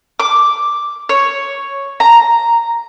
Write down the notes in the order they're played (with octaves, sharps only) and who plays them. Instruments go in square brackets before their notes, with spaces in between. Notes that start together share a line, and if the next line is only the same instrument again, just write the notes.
[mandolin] D6
C#5
A#5